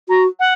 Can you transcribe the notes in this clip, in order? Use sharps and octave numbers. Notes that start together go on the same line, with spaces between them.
F#4 A#5
F#5